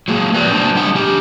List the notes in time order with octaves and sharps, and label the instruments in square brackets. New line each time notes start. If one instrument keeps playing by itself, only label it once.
[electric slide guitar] F#3 G#3 A#3
A2 F3 B4 D5
F#3 B3 D4 C5
G3 D4 F#5
E3 G4